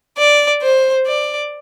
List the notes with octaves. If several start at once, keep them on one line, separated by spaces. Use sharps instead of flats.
D5
C5
D5